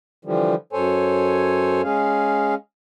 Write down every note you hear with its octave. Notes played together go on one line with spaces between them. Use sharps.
D3 E3 F3 G3
F#2 A4 C5 C#5 G#5
G#3 C#4 G#4 F5